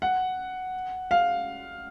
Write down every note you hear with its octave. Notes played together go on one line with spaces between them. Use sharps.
F#5
F5